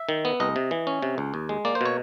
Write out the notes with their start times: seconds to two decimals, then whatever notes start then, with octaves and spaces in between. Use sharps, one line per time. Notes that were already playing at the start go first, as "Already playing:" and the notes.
Already playing: E5
0.09 D#3
0.25 B3
0.40 C2 D#5
0.56 C3
0.71 E3
0.87 C#4
1.02 C3
1.18 C#2
1.34 D#2
1.49 G#3
1.65 A#3 D5
1.75 C5
1.81 B2 C#5